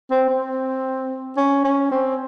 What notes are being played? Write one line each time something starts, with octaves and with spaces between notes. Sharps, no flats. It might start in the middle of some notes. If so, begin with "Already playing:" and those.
C4
C4
C#4
C#4
C4